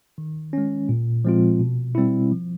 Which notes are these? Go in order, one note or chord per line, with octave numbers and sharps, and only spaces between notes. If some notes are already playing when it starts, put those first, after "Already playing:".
D#3
G#3 C#4
A#2
F3 G#3 C4 F4
B2
G3 C4 E4
F3